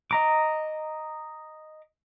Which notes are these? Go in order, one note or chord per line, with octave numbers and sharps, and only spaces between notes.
D#5 A#5 D6